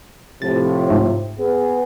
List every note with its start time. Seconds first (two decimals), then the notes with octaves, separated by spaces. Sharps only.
0.42 A2 C3 F3 A6
0.90 G#2 A3
1.39 B3 G#4